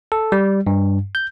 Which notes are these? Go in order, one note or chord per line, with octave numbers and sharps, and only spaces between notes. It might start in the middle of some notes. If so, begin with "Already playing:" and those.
A4
G3
G2
G6